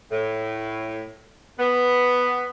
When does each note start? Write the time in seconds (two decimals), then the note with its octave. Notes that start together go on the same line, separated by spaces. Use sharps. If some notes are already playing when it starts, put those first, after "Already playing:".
0.11 A2
1.58 B3